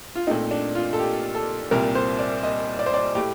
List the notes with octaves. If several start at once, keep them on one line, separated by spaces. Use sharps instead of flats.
F4
A#2 A3 C4 D#4
D4
F4
A4
G4
A4
C2 A#2 G3 C4 A#4
C5
D5
D#5
D5
C5
D5
A2 A3 G4